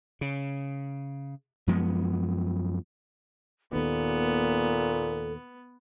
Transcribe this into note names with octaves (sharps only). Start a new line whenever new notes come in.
C#3
F#2 F3 G#3 B3
D#2 A#2 D#3 B3 A4